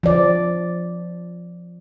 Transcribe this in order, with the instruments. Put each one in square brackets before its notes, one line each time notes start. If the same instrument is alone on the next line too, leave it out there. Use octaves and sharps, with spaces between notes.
[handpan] F3 D5